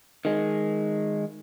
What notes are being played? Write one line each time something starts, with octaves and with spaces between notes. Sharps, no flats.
D#3 G#3